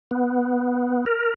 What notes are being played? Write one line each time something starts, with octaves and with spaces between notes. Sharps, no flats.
B3
A#4